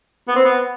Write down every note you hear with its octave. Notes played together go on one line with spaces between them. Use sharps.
B3
C4
B3